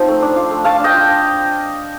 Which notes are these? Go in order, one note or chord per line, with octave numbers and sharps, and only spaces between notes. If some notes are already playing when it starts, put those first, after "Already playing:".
Already playing: F3 C4 D#4 A5
A3
D4
F4
A3
A3 F5 A5
D4 D#5 G5
F4